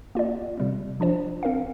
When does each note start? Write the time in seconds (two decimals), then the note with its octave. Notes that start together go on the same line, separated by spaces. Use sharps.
0.15 A#3 F4 D5
0.57 C3 G3 C4
1.00 F3 D4 F4 C5
1.43 C4 A#4 F5